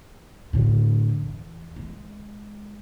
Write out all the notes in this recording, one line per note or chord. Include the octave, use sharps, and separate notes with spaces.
A2 D3
E2
G#3